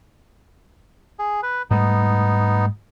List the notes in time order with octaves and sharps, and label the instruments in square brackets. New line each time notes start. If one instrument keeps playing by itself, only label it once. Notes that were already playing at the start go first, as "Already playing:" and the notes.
[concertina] G#4
B4
[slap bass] G#2 G3 A3 [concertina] B3 D#4